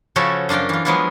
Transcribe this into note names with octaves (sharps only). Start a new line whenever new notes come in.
C#3 F3 C#4 F#4 A4 B5
F#2 D4 F4 A#4 G5
E3 F4
F3 F#3 G#3 B3 E4 F4